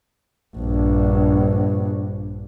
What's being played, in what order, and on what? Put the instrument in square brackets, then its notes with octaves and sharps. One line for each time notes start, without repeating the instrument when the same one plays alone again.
[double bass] A#1 G2